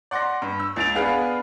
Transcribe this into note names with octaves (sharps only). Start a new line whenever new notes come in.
D5 F#5 C6 D6 A#6
G2
E6
C#2 A6 D7 F7
B3 D4 G#4 B4 F5